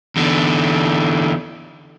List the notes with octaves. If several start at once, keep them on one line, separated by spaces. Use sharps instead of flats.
E2 D3